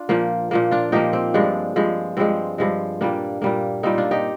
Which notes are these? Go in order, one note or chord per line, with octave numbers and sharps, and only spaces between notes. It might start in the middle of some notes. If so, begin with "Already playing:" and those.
Already playing: D4 F4
A#2 F3 A#3
A#2 F3 A#3
D4 F4
A#2 F3 A#3 D#4 G4
C4
G2 F3 G#3 D4
G2 F3 G#3
G2 F3 G#3 C4
G2 F3 G#3
A#2 G3 A#3 D4
A#2 G3 A#3
A#2 G3 A#3 C4 D#4
D4 F4
D#4 G4